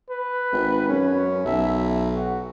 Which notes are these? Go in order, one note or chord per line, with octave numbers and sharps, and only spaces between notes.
B4
G#1
F#2 C#4
B1 E5
F#4